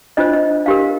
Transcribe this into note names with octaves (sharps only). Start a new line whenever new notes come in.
D4 F4 C5 D#5
D#5
D4 G4 A#4 F5